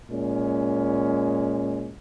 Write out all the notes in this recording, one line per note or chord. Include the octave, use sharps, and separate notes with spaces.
A#2 G#3 C#4